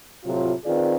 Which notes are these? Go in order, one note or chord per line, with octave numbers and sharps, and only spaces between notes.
A2 C3 F#3 F4
D#3 C4 F4 G#4 B4 D5